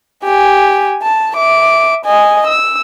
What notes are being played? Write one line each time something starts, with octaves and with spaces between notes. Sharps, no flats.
G4 G#5
A5
E5 D6
D#5 G#5
E6